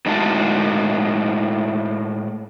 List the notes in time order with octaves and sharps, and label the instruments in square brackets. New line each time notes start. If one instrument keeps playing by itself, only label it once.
[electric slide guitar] A2 G#3 D#4 E4 F#4 A5